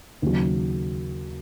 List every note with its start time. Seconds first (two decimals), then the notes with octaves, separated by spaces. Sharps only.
0.22 D#2 C#3 F#3